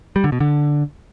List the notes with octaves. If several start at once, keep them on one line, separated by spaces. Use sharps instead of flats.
G3
D3
B2
D3